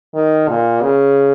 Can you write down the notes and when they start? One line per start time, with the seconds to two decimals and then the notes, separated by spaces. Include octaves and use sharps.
0.15 D#3
0.49 A#2
0.82 C#3